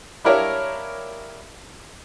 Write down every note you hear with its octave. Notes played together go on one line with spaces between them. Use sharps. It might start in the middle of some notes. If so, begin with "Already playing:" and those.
D4 E4 G4 A#4 C#5 F5